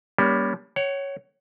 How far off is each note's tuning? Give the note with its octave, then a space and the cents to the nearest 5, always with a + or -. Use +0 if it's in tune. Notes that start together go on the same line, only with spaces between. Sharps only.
G3 +10 A#3 +40 C#4 +30
C#5 +0 F#5 +35